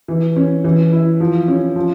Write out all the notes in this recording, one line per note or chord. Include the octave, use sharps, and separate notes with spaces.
E3
C#4
E3
E4
F3
C#4
F3